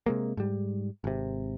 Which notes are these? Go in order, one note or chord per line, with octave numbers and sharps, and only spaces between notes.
C3 G#3 A#3
G#2 G3
G#1 C3